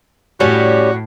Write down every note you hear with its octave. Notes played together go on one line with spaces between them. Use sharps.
A2 G3 C#4 F#4 G4